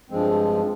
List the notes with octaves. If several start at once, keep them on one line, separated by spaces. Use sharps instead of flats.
G2 F3 G#3 C4